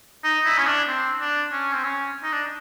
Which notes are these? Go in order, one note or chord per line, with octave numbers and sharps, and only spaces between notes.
D#4
E4
C#4
D4
C4
D4
C#4
C4
C#4
D#4
D4